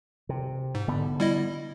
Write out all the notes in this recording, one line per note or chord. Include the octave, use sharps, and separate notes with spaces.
C3
G#2
D3 B3
G3 E4 D#5